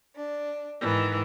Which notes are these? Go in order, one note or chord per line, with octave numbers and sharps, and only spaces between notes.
D4
G#2 D#3 E3